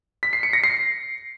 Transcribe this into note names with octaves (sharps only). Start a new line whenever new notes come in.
B6
C7
C#7
A#6
C7